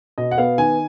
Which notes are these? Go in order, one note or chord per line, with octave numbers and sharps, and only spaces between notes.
B2 D#5
F#5
B3 F5
D#3 G#5